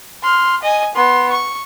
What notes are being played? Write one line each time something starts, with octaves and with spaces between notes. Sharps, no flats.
C6 F6
D#5 G#5
B3 C6
C#6